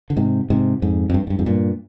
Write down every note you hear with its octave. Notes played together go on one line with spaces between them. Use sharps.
D3
G#2 C3
G#2 C3
F2 G#2
F2
G2
G#2
G2
F2 G#2
G2 A#2